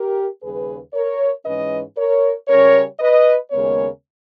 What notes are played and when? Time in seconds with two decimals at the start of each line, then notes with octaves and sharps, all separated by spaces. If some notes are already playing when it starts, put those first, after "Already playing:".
Already playing: G4 A#4
0.41 D#2 C#3 G3 G#4 B4
0.94 A#4 C#5
1.44 G#2 E3 G#3 C#4 B4 D#5
1.96 A#4 C#5
2.48 C#3 G3 C#4 A#4 C#5
3.00 B4 D#5
3.51 D#2 C#3 G#3 B3 A#4 C#5